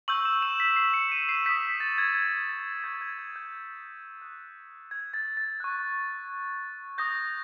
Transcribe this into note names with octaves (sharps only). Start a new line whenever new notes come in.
C#6 E6 G6 F#7
E7
E7
B6
C7
C#7
D#7
C7
D#6 G6 B6
A6
G#6
G#6
A6
C#6 E6 G6 G#6
G#6
G#6
G6
D#6 F#6
G#6
A6
A6
C#6 F#6
D#6 G6 A#6